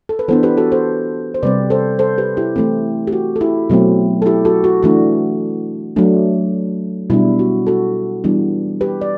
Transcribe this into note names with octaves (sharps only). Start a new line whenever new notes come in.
A4
B4
E3 B3 D4 A4 C5
G4 B4
F#4 A4
A4 C5
C5
C3 G3 C4 B4 D5
A4 C5
A4 C5
G4 B4
E4 G4
E3 A3 C4
G4
F#4
A4
E4 G4
B2 F#3 A3 C4
A4
E4 G4
F#4 A4
F#4
E3 A3 D4 F#4
F#3 A3 D4
B2 G3 D4 E4
F#4
F#4 A4
E3 G3 B3 D4
G4 B4
D5